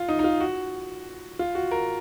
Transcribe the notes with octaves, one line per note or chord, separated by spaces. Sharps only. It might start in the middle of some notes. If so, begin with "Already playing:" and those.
Already playing: F4
D#4
D#4
F4
F#4
F4
F#4
A#4